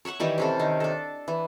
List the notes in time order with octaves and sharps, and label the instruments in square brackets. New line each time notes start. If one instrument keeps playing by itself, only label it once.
[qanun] C#5 E5 F#5 C#6
D#3 E3 G3 E4
C3 C#4 A4
D#3
D4 A4
E3